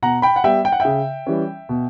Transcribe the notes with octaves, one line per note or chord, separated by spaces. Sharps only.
B2 F#5 A#5
G5 B5
F#5
G3 B3 E5 G5
G5
F#5
C#3 E5 G5
E3 G3 C#4
B2